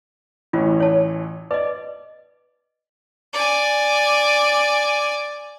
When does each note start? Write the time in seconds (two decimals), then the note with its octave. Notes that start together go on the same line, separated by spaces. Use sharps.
0.53 A1 E3 C#4 F4
0.80 C#5 A5
1.51 B4 D5 D#5
3.33 D5 G#5